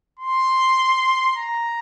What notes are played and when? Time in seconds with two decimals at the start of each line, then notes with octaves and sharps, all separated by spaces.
0.19 C6
1.36 A#5